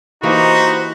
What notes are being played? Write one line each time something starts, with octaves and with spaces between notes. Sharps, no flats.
E3 A#3 D#4 F#4 G4 C5 B5